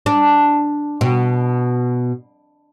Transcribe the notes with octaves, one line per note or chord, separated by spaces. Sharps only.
D4
B2